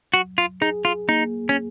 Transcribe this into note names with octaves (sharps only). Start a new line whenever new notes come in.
F#3 F#4
F4
D#4 G#4
F4
A#3 D#4
C#4